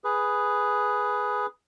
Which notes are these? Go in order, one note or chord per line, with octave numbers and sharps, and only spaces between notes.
G#4 B4